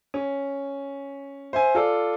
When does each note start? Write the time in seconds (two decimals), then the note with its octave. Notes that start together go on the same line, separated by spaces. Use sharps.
0.14 C#4
1.53 C5 E5 G#5
1.75 F4 A4 D5